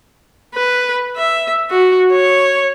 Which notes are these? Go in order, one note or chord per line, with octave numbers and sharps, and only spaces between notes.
B4
E5
F#4
C#5